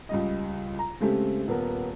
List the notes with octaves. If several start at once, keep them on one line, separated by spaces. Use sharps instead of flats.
C#2 G3 D#5
A#5
C#3 G#3 A3 C4 G4
D#1 B3 A#4